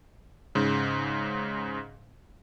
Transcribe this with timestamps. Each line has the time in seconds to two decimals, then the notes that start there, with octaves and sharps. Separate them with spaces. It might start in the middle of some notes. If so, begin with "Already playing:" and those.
0.55 G#2 C#3